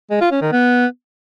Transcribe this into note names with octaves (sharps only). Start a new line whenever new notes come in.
G#3
F4
C#4
D#3
B3